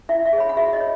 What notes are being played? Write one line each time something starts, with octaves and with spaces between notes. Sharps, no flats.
E4 E5
E5
G#4
C#5 B5
F#5
F#4 E5
D#5
C#5